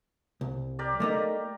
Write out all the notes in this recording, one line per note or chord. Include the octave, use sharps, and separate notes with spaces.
C2
G4 A#4 D5
A3 A#3 D#4